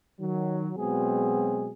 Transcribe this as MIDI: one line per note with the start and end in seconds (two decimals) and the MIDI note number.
0.20 0.71 51
0.20 0.71 54
0.77 1.71 47
0.77 1.71 54
0.77 1.71 56
0.77 1.71 59
0.77 1.71 60
0.77 1.71 68